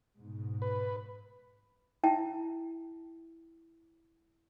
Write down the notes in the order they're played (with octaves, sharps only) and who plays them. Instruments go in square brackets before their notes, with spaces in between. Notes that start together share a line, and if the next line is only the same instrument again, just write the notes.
[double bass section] G#2 B2
[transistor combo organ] B4
[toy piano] E4 E5 G5 A5